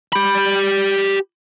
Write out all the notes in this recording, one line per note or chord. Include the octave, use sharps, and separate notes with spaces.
G4 B5